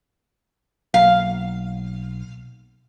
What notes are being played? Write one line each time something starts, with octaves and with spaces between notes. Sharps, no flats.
B1 F#3 A#3 F5